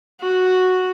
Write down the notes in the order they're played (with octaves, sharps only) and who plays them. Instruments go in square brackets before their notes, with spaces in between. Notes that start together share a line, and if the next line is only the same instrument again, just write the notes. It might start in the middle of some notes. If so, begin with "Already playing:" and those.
[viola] F#4